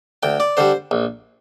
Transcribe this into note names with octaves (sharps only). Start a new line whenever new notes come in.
D2 G5
D5
D3 G3 C5
A#1